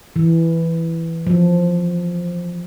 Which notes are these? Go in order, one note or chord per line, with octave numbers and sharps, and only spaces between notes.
E3
F3